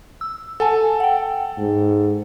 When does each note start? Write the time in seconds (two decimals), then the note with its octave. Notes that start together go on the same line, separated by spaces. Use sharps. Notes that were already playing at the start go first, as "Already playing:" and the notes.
0.21 E6
0.60 A4 F#5 G#5 A5
1.00 F#5 G5
1.58 G#2